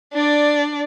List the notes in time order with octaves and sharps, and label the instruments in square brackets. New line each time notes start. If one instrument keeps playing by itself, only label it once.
[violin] D4 D5